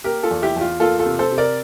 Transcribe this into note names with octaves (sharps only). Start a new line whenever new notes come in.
A#3 G4 A#4
F4 A4
E2
E4 G4
E2
F4
A#3 F4 A4
F4 A4
C3
A4 C5
C3
A#4 D5